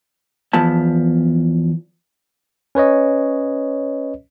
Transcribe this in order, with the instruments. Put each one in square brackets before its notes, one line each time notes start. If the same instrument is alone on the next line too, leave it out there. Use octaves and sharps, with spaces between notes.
[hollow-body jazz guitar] E2 F3 B3 A5
[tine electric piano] C#4 B4 C#5 D#5